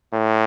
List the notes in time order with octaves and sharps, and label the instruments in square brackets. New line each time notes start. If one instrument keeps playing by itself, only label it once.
[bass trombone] A2